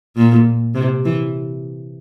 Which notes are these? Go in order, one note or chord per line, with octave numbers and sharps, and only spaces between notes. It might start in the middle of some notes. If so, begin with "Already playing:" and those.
A#2
C3
E3